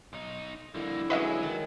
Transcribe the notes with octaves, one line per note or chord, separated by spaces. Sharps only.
B1 D#4
F2 D3 G3 A#3 E4
F#3 G#3 C#4 B4 D#5 E5
D#3